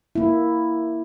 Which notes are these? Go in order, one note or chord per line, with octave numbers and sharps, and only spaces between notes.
A#3 E4